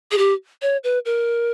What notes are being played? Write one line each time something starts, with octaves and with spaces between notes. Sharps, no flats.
G#4
G4
C#5
B4
A#4